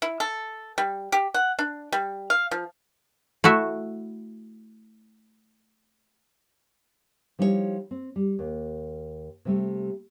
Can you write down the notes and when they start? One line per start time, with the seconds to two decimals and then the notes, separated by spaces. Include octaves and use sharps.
0.02 E4
0.20 A4
0.78 G3
1.12 G4
1.34 F#5
1.59 D4
1.92 G3
2.30 F5
2.51 F3
3.44 A3 E4 F#4 E5
7.39 F3 G3 D#4 E4 A4 C#5
7.91 C4
8.16 G3
8.39 D#2
9.45 C3 G3 A3